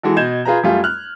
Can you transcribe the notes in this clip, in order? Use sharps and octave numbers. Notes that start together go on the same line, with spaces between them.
E3 G#3 F#4 A4
B2 D#5 G6 G#6 E7
F4 G#4 B4 A#5
F#2 G3 A3 F4
F6 F#6